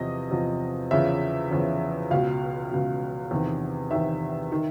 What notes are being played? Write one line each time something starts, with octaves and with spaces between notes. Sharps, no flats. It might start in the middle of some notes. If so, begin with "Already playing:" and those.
Already playing: E2 C3 F3 D#5
E2 C3 F3
E2 C#3 F3 E5
E2 C#3 F3
C#2 B2 F5
C#2 B2
E2 C3 D#3
E2 C3 D#3 E5
D#3